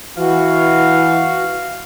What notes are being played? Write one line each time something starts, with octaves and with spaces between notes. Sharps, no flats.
E3 F#4 F5